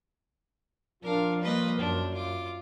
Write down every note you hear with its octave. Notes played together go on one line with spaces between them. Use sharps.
F3 D4 F4 A#4 F5
G3 A#3 B4 D#5
F#2 D4
F4 D6